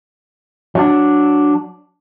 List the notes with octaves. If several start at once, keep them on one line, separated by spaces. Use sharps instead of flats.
F#3 D4